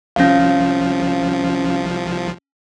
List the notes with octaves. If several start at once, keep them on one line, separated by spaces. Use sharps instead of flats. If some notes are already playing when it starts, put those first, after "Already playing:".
C2 F3 C#4 F5